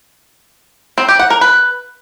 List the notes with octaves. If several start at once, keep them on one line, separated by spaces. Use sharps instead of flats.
C4
G4
F#5
A#4
B4